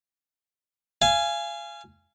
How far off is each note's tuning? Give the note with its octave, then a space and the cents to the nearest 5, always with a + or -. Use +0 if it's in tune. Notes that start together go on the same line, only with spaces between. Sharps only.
F5 -30 G#5 +0